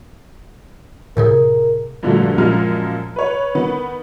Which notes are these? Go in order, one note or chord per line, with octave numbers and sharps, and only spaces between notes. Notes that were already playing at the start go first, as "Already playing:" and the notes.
A2 C3 G#4 A#4
G2 A#2 D3 F3 F#3 A3
F#2 A#2 F3 G#3 F6
B4 C#5
D#3 B3